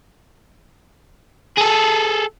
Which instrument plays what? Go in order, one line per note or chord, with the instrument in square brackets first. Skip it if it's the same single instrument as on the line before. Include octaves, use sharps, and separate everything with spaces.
[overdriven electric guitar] G#4 A4